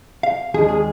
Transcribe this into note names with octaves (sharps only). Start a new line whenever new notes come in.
F5
D#2 D#3 G#3 D4 G#4
G#4